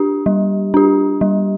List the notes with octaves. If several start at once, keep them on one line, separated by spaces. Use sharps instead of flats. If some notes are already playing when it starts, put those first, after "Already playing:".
Already playing: D4 G4
G3
D4 G4
G3